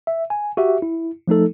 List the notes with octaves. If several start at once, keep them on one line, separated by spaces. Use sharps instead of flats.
E5
G#5
F#4 G4 E5
E4
F3 A3 D#4 A4